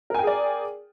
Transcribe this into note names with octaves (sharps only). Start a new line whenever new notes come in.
G#4 A#4 D5 G5 G#5